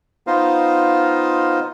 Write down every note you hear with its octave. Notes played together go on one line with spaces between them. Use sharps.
B3 D#4 F4 C5 D#5 F5